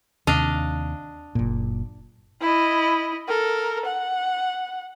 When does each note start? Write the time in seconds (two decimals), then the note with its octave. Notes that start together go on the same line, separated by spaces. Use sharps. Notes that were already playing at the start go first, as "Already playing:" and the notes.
0.27 D#2 C3 D4 D#5 F5
1.35 F#1 A#2
2.41 E4 D#5
3.28 A4 A#4
3.86 F#5